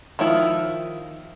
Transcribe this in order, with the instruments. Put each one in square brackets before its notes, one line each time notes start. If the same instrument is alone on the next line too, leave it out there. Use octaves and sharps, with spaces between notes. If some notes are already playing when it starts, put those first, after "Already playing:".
[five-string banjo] D#3 F3 E4 F4